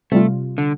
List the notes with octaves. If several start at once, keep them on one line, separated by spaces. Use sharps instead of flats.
C3 G3 A3 F4
D3